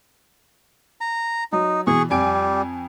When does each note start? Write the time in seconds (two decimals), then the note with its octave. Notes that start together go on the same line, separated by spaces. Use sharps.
1.01 A#5
1.52 F#3 D#4
1.87 B2 E3 G#4 C#6
2.10 F2 G3 G#5 D7